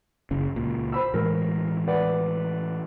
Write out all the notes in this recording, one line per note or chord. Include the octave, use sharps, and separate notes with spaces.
F#1 C#3
C#2 A#2
C5 B5 E6
A2 E3 G#3 A#4
B4 D5 F#5